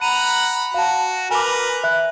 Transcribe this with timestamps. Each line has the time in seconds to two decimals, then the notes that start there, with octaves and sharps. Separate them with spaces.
0.01 F#5 A#5 B5 D#7
0.74 F#4 F5 A5
1.31 A#4 B4 G#5 D6
1.84 E5 F#6